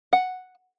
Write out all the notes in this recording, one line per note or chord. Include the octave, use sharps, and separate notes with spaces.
F#5